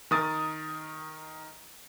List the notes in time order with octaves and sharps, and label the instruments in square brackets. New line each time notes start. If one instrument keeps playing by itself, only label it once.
[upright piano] D#3 A#4 D#6 A6